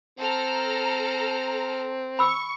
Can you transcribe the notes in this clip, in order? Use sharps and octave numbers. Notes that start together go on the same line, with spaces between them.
C4 A4 A#5 F6
B5 C#6 E6